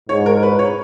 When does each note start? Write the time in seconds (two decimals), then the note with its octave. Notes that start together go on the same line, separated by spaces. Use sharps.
0.09 G#2 C#5
0.26 A#4
0.43 B4
0.59 C#5